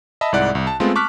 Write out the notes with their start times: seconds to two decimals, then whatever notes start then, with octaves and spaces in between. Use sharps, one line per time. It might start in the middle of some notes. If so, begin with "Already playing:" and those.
0.21 D#5 E5 A5 B5
0.32 C2 G#2 E4 D5 F#5 F#6
0.55 C2
0.67 A5
0.80 G#3 A3 B3 C4 F4 A4
0.95 A5 C#6 D6 F6 F#6 B6